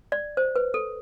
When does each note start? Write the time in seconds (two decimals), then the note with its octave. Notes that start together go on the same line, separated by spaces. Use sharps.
0.12 D5
0.37 C5
0.56 B4
0.74 A4